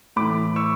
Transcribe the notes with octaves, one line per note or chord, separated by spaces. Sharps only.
A2 E3 B5 D6
C#6 E6